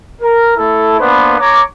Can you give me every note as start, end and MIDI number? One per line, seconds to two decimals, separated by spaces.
0.22 0.55 70
0.57 0.98 57
0.57 0.98 64
0.57 0.98 69
0.99 1.36 58
0.99 1.36 59
0.99 1.36 62
0.99 1.36 71
0.99 1.36 72
1.39 1.62 73
1.39 1.62 82
1.39 1.62 86